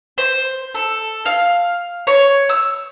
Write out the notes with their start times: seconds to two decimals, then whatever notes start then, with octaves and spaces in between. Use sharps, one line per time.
0.18 C5
0.75 A4
1.26 F5
2.07 C#5
2.49 E6